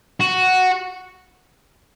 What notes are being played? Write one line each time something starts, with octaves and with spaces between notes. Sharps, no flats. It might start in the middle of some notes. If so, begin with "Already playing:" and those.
F#4